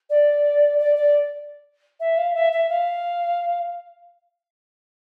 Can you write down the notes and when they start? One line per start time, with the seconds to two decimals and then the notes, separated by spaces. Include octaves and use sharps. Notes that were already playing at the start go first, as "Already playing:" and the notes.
0.10 D5
0.79 D5
0.96 D5
2.00 E5
2.17 F5
2.35 E5
2.52 E5
2.69 F5